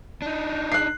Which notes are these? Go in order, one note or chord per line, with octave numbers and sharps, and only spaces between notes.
D4 D#4
F#6 C7